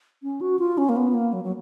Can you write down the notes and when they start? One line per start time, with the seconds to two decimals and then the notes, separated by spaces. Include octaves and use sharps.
0.23 C#4
0.41 F#4
0.59 F4
0.78 C#4
0.89 A#3
0.96 B3
1.14 A#3
1.33 F#3
1.44 F#3